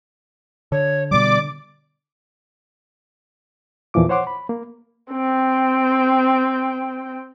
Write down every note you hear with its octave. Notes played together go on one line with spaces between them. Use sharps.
D3 C#5
B2 G3 D5 D6
E2 A#2 E3 F3 D6
C5 C#5 F#5 C6 D6
B5
A#3
C4 G5